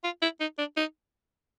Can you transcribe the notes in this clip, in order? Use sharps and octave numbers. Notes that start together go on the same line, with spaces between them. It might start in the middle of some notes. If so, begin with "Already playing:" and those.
F4
E4
D#4
D4
D#4